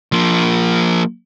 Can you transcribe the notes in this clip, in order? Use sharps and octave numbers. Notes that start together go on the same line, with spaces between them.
F3 A#3